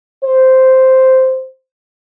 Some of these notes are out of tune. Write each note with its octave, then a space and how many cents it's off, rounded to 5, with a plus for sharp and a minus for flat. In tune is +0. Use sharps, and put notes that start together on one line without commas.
C5 -5